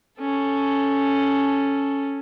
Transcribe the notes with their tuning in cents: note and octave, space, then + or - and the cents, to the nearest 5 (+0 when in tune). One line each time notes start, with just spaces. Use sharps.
C#4 +0 A4 -5